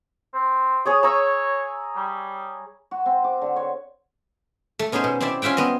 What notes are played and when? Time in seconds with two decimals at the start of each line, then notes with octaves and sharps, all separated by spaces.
0.34 C4
0.86 G#4 C#5 D#6
1.03 C#5 A#5 E6
1.96 G3
2.91 F#4
3.06 C4
3.24 D6
3.41 D3
3.56 C#5
4.79 A3
4.92 B3 C#4 D#4 G#4 C5
5.04 B2
5.21 C4 E4 C5 D5 E5
5.42 C#4 F4 E5 F#5 G5
5.57 B3 C4 D#5